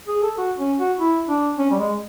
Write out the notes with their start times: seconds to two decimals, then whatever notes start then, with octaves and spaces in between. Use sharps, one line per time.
0.08 G#4
0.23 A4
0.38 F#4
0.58 C#4
0.79 F#4
0.99 E4
1.29 D4
1.59 C#4
1.71 G3
1.79 G#3